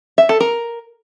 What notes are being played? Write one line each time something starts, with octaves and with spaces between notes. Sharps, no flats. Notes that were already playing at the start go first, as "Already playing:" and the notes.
E5
A4
A#4